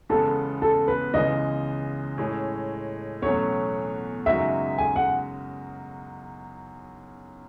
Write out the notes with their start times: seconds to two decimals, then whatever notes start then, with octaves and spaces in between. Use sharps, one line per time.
0.09 E2 C#3 G#3 B3 A4
0.62 A4
0.88 B4
1.14 C#2 C#3 E3 G#3 D#5
2.18 A2 G#3 C#4 G#4
3.22 E2 B2 F#3 A3 C#4 C#5
4.26 F#2 C#3 G#3 D#4 F#4 E5
4.78 G#5
4.96 F#5